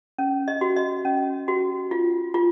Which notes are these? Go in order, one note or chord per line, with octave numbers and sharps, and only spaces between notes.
C#4
D#5
F#4
D#5
C#4
F#4
F4
F4